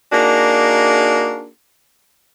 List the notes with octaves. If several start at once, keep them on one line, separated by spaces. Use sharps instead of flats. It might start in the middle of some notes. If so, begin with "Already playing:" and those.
A#3 D4 D#4 F#4 G#4